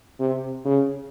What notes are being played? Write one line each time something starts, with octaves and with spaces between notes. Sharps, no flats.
C3
C#3